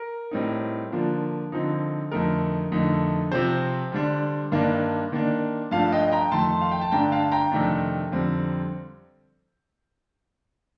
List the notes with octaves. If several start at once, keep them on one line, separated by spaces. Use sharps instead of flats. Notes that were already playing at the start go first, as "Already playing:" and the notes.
Already playing: A#4
A2 G3 C4 D#4
D3 F3 A#3 D4
D3 F3 C4 D#4
F2 D3 A3 D#4 A#4
F2 D3 A3 D#4
C3 F3 C4 C5
D3 G3 D4
G2 D#3 A#3 D4
D#3 A#3 D4
G2 F3 A3 D4 F5 A5
D#5 G5
G5 A#5
F2 D#3 A3 A5 C6
F5
G5
A5
G2 D3 A3 D4 G5 A#5
F5 A5
G5 A#5
F2 C3 D#3 A3 D4
F2 D3 G3 C4